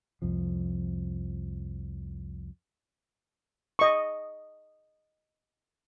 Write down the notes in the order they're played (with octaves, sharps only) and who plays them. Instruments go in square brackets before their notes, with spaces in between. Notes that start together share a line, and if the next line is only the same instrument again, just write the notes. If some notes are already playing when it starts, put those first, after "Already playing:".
[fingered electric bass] C2 F2 F3
[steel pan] D#5 C#6